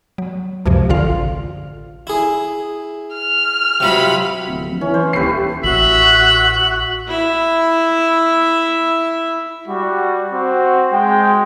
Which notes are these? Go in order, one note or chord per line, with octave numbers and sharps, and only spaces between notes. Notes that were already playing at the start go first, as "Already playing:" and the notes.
F#3
C#2 F#2 C3 F3
A1 D3 F4 F5
E4 G#4
F6
C3 F#3 F4 B5
D1
F2
E3 C#4
C5
D#1 A3 G4 B4 C7
A1 F#4 E5 F#7
E4 E5
G3 F#4
C4 F#4
G#3 G5